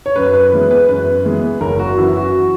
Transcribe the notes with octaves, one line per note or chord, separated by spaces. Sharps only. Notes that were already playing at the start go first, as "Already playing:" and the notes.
C#5
F#2 B4
B4
E3 G#3 B3 B4
B4
F#2 B4
E3 G#3 B3
F#1 A#4
F#4
F#2 E3 E4
F#4